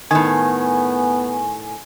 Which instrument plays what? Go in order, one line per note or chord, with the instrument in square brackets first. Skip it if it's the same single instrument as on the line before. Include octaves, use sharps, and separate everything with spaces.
[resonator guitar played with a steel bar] A2 D#3 [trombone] B3 [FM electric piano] G#5